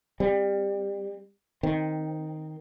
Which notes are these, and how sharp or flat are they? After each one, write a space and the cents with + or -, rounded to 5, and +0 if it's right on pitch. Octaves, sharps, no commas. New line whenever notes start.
G3 +25 C4 +0
D#3 +0 C4 +5